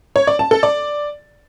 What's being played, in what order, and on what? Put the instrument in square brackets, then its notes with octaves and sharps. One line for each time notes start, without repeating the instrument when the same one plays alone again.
[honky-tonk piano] C#5
D5
A5
A4
D5